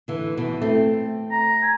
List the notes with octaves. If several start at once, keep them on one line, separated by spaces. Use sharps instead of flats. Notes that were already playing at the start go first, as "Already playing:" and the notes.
D3 E3
B2 E3
A3 C4
A#5
G#5